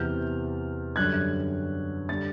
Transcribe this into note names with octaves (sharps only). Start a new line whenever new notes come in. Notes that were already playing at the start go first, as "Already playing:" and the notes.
Already playing: E2 C3 E3 F6 G6
F#2 D3 G3 F#6 G#6
D3 G3 A6